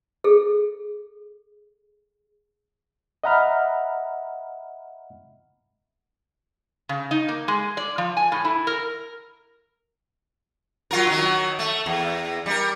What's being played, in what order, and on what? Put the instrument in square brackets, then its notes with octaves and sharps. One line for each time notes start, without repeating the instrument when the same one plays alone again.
[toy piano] G#4 A4
[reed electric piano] D#5 E5 F#5 A#5 B5 F6
[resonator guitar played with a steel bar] C#3
D#4
A#3
G#3
D5
F3
G#5
A2
E4
A#4
[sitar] F#3 F4 A#4
D#3 F#3
A3
E2
G3 A#4